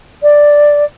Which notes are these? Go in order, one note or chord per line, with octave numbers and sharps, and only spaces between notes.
D5